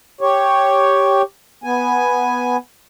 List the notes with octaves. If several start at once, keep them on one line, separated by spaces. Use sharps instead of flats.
G4 C#5
B3 G#5